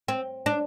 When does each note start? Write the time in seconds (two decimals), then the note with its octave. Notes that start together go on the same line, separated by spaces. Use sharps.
0.08 C4
0.46 D4